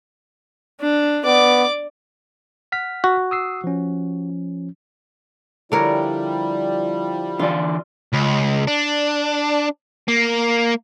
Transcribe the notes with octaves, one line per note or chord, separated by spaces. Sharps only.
D4
B3 D5 D6
F#5 F6 B6
F#4
D#6 E6 C7
F3 C#4
D3 F3 G3 E4 A#4 C#5
D3 E3 F4 D5
C#2
D4
A#3